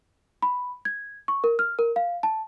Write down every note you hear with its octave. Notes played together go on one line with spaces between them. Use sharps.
B5
G#6
C#6
A#4
F6
A#4
F5
A5